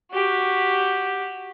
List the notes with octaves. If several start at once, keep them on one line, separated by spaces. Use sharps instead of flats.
F#4 G4